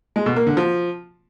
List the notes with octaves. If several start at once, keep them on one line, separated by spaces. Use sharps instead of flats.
G#3
B2
A#3
D3
F3